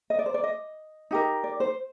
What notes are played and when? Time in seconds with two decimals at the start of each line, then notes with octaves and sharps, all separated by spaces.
0.10 D#5
0.19 D5
0.26 C5
0.34 D5
0.44 D#5
1.11 D#4 G4 A#4
1.44 D5
1.60 C5